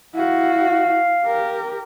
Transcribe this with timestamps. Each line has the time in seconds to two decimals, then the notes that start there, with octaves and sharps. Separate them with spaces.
0.15 E4 F#4 F5
1.26 G4 A#4